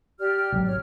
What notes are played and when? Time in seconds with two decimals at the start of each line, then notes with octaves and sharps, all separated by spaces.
0.19 G4 D5 F6
0.52 G#1 D3 F#3
0.65 C#5 F6